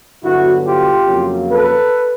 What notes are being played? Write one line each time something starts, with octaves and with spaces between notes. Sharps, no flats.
G2 D3 F#3 B3 E4 F#4
F4 G4
F2 C#3 F#3 A#3
A4 B4